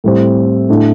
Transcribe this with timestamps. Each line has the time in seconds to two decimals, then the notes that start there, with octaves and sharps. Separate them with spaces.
0.04 A2 G3 C4
0.69 A2 A3 D4